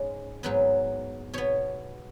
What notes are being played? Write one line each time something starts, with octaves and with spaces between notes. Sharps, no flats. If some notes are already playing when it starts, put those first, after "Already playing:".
Already playing: G#2 G#3 C#4 G#4
G#2 F#3 B3 B4
B2 B3 C#5